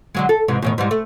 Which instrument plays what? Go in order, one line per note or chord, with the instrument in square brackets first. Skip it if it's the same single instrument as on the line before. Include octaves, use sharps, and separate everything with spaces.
[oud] D3 F#3 G#3
A4
G#2 C3 E3
E2 A2 D#3
G#2 E3 G3
A3